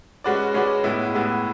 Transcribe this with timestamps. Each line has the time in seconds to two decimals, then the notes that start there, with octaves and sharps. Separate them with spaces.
0.24 G#3 C#4 F#4 B4 D5
0.54 G#3 C#4 F#4 B4 D5
0.84 A2 G#3 B3 E4
1.14 A2 G#3 B3 E4